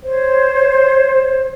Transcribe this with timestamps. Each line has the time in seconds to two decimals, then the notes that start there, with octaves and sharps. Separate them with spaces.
0.03 C5 C#5